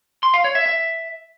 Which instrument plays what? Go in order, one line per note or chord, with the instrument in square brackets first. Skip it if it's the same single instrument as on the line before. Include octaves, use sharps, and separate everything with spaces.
[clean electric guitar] C6
F5
C#5
E5
E5